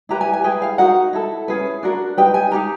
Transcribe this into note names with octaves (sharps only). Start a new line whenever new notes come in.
E4 G4 B4 A#5
G#5
G#5
E4 G#4 B4 G5
F5
D#4 F#4 A#4 F#5
E4 A4
C#4 E4 G#4 B4
D4 F#4 A#4
D#4 G4 B4 G5
G#5
D#4 G4 A#4 A#5